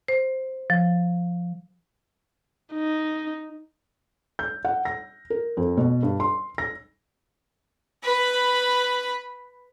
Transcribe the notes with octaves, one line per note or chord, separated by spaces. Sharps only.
C5
F3
D#4
G6
F#5
A#6
A#4
F2
B2
G2
C6
A#6
B4 B5